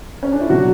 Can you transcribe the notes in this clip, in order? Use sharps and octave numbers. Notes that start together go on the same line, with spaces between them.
C#4
D4
E4
B2 F#3 F#4